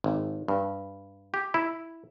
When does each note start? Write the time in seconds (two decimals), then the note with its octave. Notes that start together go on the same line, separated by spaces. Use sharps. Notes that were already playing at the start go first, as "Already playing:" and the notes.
0.04 G#1
0.48 G2
1.34 G4
1.54 E4